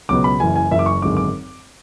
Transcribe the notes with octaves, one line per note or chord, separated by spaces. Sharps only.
C#2 B2 F#3 B3 D6
B5
F#1 F#2 E3 G#5
G#5
F#1 F#2 E3 E5
D6
C#6
G#1 F#2 D3 G#3 D6
D6